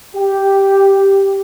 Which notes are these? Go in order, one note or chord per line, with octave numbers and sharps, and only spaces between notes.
G4